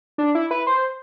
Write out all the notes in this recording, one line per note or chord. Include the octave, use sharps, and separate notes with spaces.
D4
E4
B4
C5